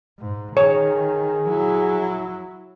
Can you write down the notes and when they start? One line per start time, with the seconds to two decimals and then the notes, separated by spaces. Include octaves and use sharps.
0.19 G#2
0.57 D#3 G#4 C#5
1.48 F#3 E4